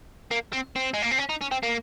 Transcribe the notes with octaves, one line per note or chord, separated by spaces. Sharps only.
A#3
C4
C4
G#3
A#3
C4
C#4
D#4
C#4
C4
A#3